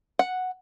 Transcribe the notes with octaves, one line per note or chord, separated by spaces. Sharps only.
F#5